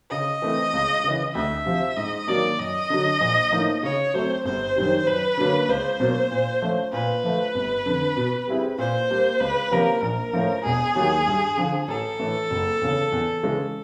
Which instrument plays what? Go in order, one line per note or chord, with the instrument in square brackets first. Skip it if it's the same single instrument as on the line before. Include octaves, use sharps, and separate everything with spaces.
[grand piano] C#3 [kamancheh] D#5
[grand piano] E3 A3 C4
C#2
C#3 E3
[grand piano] D2 [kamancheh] E5
[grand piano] C3 F3
[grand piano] G#2 [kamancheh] D#5
[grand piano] D#3 F#3 A#3 [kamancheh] D5
[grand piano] F#2 [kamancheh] D#5
[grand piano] D3 F#3
A#1
A2 F3 A#3 D#4
[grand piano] C#3 [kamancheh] C#5
[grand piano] F#3 A3 C4 [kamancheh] C5
[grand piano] G1 [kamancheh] C5
[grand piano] F#2 D#3 G3
[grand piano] F#2 [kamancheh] B4
[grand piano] D3 F#3 A#3 C#4
[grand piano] C#2 [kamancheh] C5
[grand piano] B2 F#3 A#3
A#2
F3 A3 C#4
[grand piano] A#2 [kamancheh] B4
[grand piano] F3 A3
G1
F2 D3
B2
G3 C4 E4 G#4
[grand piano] A#2 [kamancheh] C5
[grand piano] G3 A#3
[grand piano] C#2 [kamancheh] B4
[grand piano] C3 F3 A#3 C#4 [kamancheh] A#4
[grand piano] A#1 [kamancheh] A#4
[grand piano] A2 F3 A3 C#4
[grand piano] E1 [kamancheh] G#4
[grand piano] D#2 D#3 F#3
G2
D3 F3
[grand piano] A1 [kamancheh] A4
[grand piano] A2 E3
F#1
E2 C#3
E2
C#3 E3 G#3 C#4